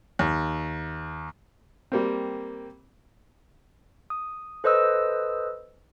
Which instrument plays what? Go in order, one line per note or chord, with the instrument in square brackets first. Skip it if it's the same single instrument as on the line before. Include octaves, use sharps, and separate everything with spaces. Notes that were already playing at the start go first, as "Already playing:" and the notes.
[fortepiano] D#2
G3 A#3 C4
[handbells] D#6
A4 B4 C5 D#5 D#6 E6